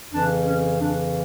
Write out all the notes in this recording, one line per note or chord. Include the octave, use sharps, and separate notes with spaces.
F2 C#3 E3 D4
C#4
F2 C#3 E3 D4